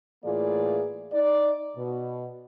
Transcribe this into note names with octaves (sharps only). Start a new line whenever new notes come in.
A2 E3 A#3 F4 G#4 D5
D#4 D5
B2